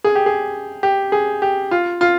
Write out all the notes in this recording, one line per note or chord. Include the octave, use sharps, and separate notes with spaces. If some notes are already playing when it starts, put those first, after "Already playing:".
G#4
G4
G#4
G4
G#4
G4
F4
F4